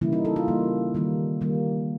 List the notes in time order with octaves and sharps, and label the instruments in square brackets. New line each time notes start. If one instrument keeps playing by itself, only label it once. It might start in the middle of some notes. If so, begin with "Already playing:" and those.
[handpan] C#3 E3 G3 A#3 E4
D#4
A4
F4
C#3 E3 G3 A#3
D#3 G3 A#3
D#3 G3 A#3